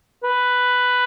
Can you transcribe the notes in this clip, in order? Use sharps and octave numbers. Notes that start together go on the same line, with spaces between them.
B4